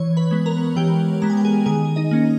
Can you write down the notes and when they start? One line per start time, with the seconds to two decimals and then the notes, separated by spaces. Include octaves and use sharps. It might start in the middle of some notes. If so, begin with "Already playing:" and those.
Already playing: E3 C#5 C#6
0.17 B4 B5
0.31 G#3 B3
0.46 A#4 A#5
0.76 E3 G4 G5
1.22 G#3 B3 A#5
1.30 G#5
1.37 G5
1.45 G#4 G#5
1.66 D#3 G#4 G#5
1.96 D#4 D#5
2.11 A#3 C#4